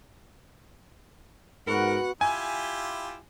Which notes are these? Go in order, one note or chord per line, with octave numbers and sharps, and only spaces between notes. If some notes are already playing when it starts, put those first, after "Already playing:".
G#2 B3 F#4 A#4 F#5
E4 F4 G4 G#5